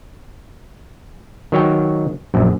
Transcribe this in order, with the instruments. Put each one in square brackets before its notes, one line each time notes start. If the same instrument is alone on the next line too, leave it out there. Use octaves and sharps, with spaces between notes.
[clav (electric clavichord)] D#3 F#3 C#5 G5
A#1 F#2